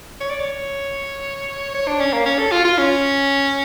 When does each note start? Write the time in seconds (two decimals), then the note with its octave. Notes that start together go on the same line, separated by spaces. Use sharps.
0.20 C#5
0.30 D5
0.40 C#5
1.74 C#5
1.87 D4
2.00 C#4
2.13 A#3
2.26 C#4
2.38 A4
2.51 F4
2.65 F4
2.78 C#4